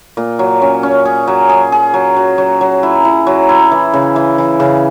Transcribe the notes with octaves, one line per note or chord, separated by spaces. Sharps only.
A#2
F#3
C#4
C#4
G#4
F#3
G#4
G#4
F#3
F#3
F#3
F#3
E4
E4
F#3
E4
E3
C#3
E3
E3
C#3